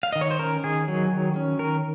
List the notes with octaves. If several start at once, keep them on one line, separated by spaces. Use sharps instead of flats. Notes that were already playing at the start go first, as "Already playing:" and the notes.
F5
D#3 D#5
C#5
C5
C#4 A#4
D#3 G#4
F#3
D#3
C#4
D#3 A#4